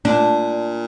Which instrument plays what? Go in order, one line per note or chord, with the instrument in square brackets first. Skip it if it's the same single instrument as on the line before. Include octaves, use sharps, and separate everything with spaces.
[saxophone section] A#2 [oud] D4